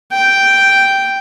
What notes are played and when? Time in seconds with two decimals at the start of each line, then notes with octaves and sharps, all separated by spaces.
0.12 G5